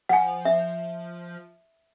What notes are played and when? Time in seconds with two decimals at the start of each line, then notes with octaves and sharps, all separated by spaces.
0.09 F3 F#5 G#5
0.45 E5